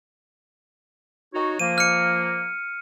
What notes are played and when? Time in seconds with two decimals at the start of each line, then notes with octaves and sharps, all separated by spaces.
1.34 D#4 F#4 C#5
1.59 F3 A#3 D#7
1.78 F6 C#7